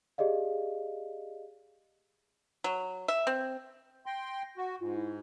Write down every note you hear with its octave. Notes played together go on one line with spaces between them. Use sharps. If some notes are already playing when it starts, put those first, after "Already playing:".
G4 G#4 D5 D#5 F5
F#3
E5
C4
G5 C6 A#6
F#4
G#2 F4
E4